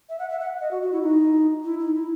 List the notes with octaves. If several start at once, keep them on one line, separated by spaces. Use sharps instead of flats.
E5
F#5
E5
F#5
D#5
F#4
F#4
E4
D#4
E4
D#4
E4